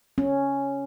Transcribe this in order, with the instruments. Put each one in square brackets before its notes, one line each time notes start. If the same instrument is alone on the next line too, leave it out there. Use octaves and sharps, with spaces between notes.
[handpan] C#4